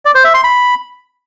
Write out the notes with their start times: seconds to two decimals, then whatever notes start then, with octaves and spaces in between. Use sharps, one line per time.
0.05 D5
0.15 C5
0.24 E5
0.34 C6
0.44 B5